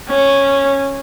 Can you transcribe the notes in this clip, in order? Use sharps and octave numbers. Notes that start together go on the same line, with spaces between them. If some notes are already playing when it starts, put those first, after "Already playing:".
C#4